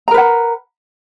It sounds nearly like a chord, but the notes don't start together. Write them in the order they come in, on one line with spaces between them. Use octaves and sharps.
A#5 A#4 B4 F#5